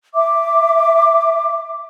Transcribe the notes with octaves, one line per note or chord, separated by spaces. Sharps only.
E5 D6